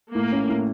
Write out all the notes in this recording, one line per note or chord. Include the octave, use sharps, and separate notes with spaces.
A2 A#3
C#4
A2